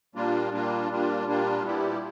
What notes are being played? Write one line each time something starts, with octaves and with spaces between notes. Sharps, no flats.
A#2 G3 A#3 D4 F4
A#2 G3 A#3 D4 F4
A#2 G3 A#3 D4 F4
A#2 G3 A#3 D4 F4
A#2 G3 B3 E4 G4